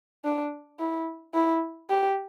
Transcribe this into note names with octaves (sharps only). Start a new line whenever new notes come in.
D4
E4
E4
G4